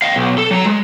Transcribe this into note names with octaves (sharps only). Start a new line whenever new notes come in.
D#5 F5
B1
A4
F#3 A#5
G#3